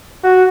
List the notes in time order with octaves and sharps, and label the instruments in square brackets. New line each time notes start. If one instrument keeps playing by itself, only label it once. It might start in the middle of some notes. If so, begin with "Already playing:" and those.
[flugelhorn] F#4